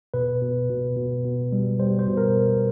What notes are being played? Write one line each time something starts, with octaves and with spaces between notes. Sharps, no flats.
B2 B4
B2
B2
B2
B2
G3
G3 C5
C5
B2
A#4